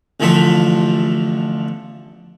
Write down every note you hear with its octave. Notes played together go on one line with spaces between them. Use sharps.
A1 D3 F3 A3 E5